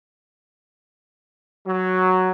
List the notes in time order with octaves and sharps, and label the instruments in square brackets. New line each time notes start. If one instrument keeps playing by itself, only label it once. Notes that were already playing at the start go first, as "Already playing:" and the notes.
[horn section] F#3